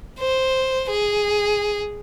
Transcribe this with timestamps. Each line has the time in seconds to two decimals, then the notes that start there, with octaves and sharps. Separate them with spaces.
0.19 C5
0.90 G#4